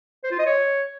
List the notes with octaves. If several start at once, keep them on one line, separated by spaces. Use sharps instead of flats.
C5
F4
D#5
C#5